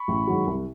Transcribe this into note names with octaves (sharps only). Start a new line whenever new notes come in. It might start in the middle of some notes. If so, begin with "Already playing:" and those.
Already playing: B5 C#6
A1
G#2 D#3 F#3
C2